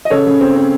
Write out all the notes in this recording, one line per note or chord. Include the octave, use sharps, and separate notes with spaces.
D#5
C#3 A4 C#5
C#3
C4
C4